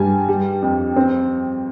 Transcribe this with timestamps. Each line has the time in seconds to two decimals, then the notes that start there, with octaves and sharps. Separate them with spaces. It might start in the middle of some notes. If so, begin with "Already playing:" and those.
Already playing: G2 G3 G#5
0.29 G3
0.62 F2
0.96 C4